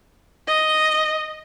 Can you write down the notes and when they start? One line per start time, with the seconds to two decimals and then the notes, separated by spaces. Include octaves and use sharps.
0.47 D#5